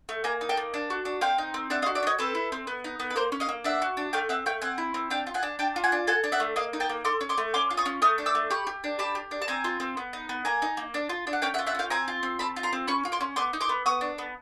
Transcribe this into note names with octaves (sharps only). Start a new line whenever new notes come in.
A3
A#3 G#5 A#5
D#4
G5 A5
A#3
D4
F#4
D4
C4 F5 G5
D#4
C4
D4 E5 F#5
D#5 F5
F#4
D5 E5
D4
C#5 D#5
C4 A4 B4
E4
C4
B3
D#4
B3
B4
A#3 A#4 C5
C#4
D#5 F5
A#3
D4 E5 F#5
F#4
D4
A3 F5 G5
C4 E5 F#5
A3 F5 G5
C4 F#5 G#5
E4
C4
D4 F5 G5
F4
F#5 G#5
D4
D4 G5 A5
F4
F#5 G#5
D4
A4 F#5 G#5
D4
E5 F#5
A3
A#3 D#5 F5
D#4
G5 A5
A#3
A4 C6 D6
C#4
C6 D6
A3
C#4 C6 D6
F4
C#6 D#6
C#4
A3 D#6 F6
D4
D6 E6
A3
G4 B5 C#6
G4
D4
G4 A5 B5
G4
D4
A5
C4 G#5 A#5
F4
C4
B3
D#4
B3
A#3 G#5 A#5
D#4
A#3
D4
F4
D4
F#5
C#4 F5 G5
E5 F#5
F4
E5 F#5
C#4 F5 G5
C4 G#5 A#5
F4
C4
C4 A5 B5
F4
A#5 C6
C4
C#4 B5 C#6
F4
C6 D6
C#4
B3 C6 D6
D#4
C6 D6
B3
B3 C#6 D#6
D4
B3